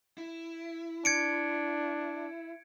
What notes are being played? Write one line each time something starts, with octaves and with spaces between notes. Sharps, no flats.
E4
D4 G#6 C#7 D7